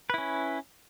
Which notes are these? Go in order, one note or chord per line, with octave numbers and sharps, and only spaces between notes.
C#4 E4 B4